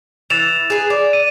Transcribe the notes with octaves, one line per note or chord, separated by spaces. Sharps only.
E3 A6 E7 F7
G#4 B4
D5
D#7